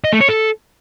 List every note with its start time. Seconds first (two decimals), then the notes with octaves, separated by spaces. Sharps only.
0.04 D#5
0.13 A3
0.21 C#5
0.29 A4